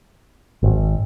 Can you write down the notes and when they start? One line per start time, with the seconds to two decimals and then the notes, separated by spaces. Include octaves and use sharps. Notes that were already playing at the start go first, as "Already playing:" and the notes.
0.63 G#1